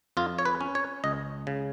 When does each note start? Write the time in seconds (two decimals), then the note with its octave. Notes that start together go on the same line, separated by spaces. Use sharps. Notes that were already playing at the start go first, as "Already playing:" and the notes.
0.17 F2 F4
0.39 C#5
0.45 B4
0.61 C#4
0.75 C#5
1.04 C#2 D#5
1.47 C#3